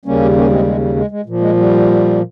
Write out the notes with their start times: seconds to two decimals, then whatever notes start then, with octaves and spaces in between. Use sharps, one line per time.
0.05 D#2 C#3 G3 A#3 C#4
0.35 A#3 C#4
0.51 G#3 C4
0.66 G#3
0.81 G3
0.96 G#3
1.11 G#3
1.26 A#2 F3
1.40 G#3
1.56 G3